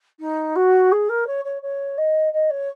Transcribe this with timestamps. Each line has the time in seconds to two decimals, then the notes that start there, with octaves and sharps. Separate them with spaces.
0.20 D#4
0.55 F#4
0.91 G#4
1.09 A#4
1.27 C#5
1.44 C#5
1.62 C#5
1.98 D#5
2.33 D#5
2.50 C#5